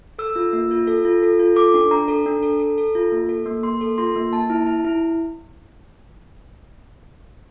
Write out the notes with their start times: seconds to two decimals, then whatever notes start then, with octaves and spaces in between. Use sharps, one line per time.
0.19 A4 E6
0.36 F4
0.53 A#3
0.71 F4
0.87 A4
1.05 F4
1.23 A4
1.39 F4
1.56 A4 D6
1.74 D4
1.91 D4 A#5
2.08 A4
2.26 D4
2.43 A4
2.60 A4
2.78 A4
2.95 F4
3.12 A#3
3.29 A4
3.46 A#3
3.63 A#3 C6
3.81 A4
3.98 F4 C6
4.16 A#3
4.32 A#3 A5
4.50 E4
4.67 E4
4.85 E4